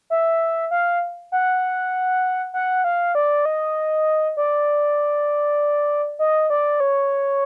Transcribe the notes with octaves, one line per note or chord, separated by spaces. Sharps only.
E5
F5
F#5
F#5
F5
D5
D#5
D5
D#5
D5
C#5